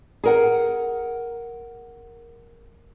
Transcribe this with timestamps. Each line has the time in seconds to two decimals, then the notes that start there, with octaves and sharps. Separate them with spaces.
0.24 G#4 A#4 F#5